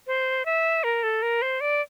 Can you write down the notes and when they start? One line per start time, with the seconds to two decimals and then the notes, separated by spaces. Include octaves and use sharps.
0.07 C5
0.45 E5
0.84 A#4
1.03 A4
1.22 A#4
1.42 C5
1.61 D5